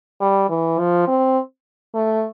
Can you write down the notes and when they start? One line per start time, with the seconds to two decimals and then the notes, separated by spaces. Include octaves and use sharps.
0.21 G3
0.49 E3
0.79 F3
1.08 C4
1.95 A3